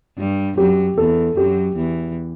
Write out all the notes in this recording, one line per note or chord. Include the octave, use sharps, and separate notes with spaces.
G2 G3
F#2 F#3 G4
E2 E3 A4
F#2 F#3 G4
E2 E3